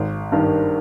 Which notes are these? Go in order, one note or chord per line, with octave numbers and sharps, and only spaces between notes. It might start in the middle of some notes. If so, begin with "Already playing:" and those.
Already playing: G#1
G2 D#3